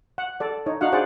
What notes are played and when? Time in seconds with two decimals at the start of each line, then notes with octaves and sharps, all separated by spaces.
0.18 F#5
0.40 A4 D5
0.66 D#4 C#5
0.81 D4 D#4 F#4 F5 F#5
0.92 G#4 C5 D5 F#5